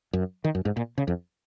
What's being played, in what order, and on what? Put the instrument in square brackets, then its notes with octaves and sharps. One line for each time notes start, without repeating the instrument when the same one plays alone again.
[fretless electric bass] F#2
D#3
F#2
G#2
A#2
C#3
F2